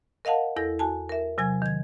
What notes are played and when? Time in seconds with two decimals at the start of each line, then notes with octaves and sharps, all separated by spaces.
0.25 A#4 D#5 F5 F#5 A5
0.56 E2 E4 A4 A#6
0.79 F#4 G#5 A5
1.09 A#4 E5
1.38 C3 F#3 G#5 G#6
1.62 D#3 G#6